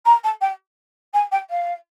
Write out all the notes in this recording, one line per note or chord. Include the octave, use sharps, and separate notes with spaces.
A#5
A5
G5
G#5
G5
F5